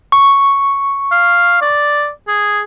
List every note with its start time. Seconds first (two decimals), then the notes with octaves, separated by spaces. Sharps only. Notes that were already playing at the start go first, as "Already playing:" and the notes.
0.12 C#6
1.12 F5
1.62 D5
2.28 G#4